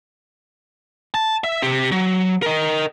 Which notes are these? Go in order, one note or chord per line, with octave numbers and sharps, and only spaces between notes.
A5
E5
C4 G4
F#3
A#4 D#5